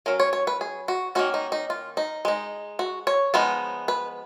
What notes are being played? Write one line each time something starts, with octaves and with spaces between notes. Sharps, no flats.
F#3 C#4 A#4
C#5
C#5
B4
G#4
F#4
D#3 A#3 C#4 F#4
D#4
D#4
F4
D#4
G#3 D#4
F#4
C#5
F3 G#3 B3 D#4
B4